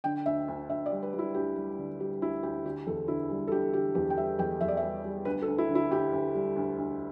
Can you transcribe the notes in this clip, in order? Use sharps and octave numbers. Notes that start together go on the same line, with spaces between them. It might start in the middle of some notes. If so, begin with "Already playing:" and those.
D3 G5
D2 E5
D2
D2 E5
D5
G3
B4
G3
E4
D2 G4
G3
D3
G3 G4
D2 E4
D2 G4
D3 G4
E2 A4
D3 E4
G3
A4
D3 G4
D3 G4
E2 G4
G5
G3 E5
E2 G5
E2 E5
D5
E5
G3
G3
D2 B4
A4
D2
E4
D3
E4
D2 G4
D2
G3
D2
D2